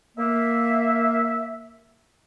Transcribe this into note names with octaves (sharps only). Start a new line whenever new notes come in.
A#3 E5